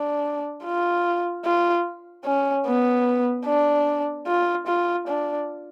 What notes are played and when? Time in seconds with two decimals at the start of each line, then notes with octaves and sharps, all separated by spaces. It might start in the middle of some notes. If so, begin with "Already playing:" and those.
Already playing: D4
0.64 F4
1.45 F4
2.25 C#4
2.67 B3
3.46 D4
4.27 F4
4.68 F4
5.08 D4